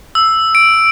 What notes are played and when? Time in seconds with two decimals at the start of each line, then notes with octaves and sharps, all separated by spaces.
0.15 E6
0.55 D7